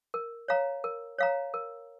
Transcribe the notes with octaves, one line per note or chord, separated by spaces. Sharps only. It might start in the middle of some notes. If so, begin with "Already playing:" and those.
A#4
C#5 F5 A#5
A#4
C#5 F5 A#5
A#4